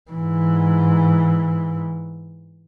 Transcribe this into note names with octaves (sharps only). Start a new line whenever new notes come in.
G#2 E3